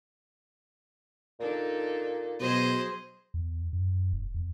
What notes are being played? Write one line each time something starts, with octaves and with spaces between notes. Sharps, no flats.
A#2 D4 D#4 A4
B2 F#3 G#4 C5 D#5
E2
F#2
E1
E2